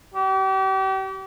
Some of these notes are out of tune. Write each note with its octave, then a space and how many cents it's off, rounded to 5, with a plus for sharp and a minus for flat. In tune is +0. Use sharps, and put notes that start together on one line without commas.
G4 -35